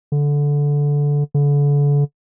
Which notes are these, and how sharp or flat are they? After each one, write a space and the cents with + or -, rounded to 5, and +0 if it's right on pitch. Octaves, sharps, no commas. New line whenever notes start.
D3 -15
D3 -35